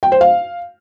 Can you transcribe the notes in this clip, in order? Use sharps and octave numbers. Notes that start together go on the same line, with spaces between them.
G5
C5
F5